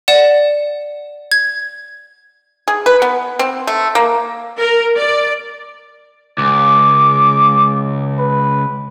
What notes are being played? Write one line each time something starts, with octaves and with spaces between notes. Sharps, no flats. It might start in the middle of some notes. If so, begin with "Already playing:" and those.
D5 F#5 E7
G#6
G#4
B4
B3
C4
A3
A#3
A#4
D5
C#2 D6
B4